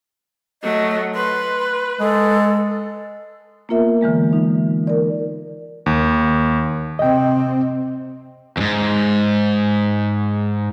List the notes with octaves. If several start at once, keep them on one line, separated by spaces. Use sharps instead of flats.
F#3 A3 D#5
B4 C6
G#3 A4
A#3 B3 F4 A#4 E5
D3 E3 G#3 A#3
D#4
A#4 D5
D#2
C3 C4 D#5 G5
E2 G#2